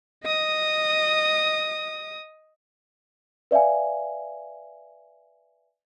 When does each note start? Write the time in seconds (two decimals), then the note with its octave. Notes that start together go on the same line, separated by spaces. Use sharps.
0.24 D#5 D#6
3.51 B4 D5 E5 F5 G#5